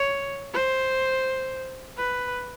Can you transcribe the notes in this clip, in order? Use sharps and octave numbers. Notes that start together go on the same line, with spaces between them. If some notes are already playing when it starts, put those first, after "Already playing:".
Already playing: C#5
C5
B4